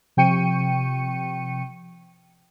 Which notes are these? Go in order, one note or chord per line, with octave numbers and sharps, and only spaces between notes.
C3 F3 G5 C#6 C#7 D#7